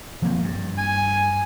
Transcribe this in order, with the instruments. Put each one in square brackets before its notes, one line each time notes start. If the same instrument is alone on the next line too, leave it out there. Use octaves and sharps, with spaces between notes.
[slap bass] F3 A#3 C4
G2
[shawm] G#5